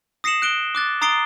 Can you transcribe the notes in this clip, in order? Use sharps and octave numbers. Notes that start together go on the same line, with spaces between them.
D#6 A#6 C7 C#7 E7 F#7
F#6 D7 G7
D6 F#6 A6
A#5 D#6 A6 C7 D7 G7